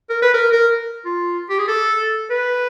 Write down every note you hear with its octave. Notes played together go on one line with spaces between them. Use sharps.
A#4
B4
A#4
A#4
F4
G4
G#4
A4
B4